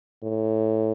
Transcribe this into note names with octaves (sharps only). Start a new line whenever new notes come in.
A2